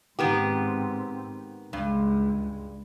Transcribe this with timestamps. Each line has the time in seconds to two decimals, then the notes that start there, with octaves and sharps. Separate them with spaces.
0.19 G#2 D#3 B3 C4 G4
1.73 C#2 G2 G#3